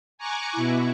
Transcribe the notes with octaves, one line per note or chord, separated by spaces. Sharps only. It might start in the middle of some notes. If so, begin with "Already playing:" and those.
G#5 A#5 C#6 D6 F#6
B2 E4